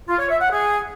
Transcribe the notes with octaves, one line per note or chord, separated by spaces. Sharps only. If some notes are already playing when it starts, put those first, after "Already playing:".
F4
C#5
E5
F#5
G#4